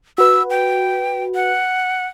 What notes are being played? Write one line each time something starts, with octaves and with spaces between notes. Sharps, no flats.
F#4 B4 E6
G5
F#5